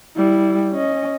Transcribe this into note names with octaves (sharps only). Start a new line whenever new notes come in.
G3 E4
C#4 D#5